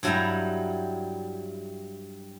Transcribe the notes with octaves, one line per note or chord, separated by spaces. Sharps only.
G2 F#3 G3 E4 G5 A#5